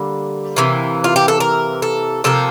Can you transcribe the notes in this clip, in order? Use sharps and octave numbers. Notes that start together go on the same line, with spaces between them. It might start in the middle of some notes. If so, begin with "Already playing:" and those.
Already playing: D3 G3 A#3
C3 E3 A#3
F4
G4
A4
A#4
A4
C3 F3 A#3 A4